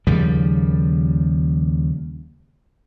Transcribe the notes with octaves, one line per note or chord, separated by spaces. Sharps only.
D#2 C#3 F3 G3